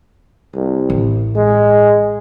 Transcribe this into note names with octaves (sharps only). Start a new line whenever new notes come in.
C2
A1
G#3